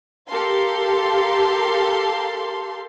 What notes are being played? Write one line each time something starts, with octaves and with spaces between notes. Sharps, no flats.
G4 A4 A#4 F5 C6